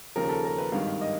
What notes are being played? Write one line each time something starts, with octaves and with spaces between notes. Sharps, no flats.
D#2 C#3 F3 A#4
A4
A#4
B4
G#1 G2 D#3 F5
D#5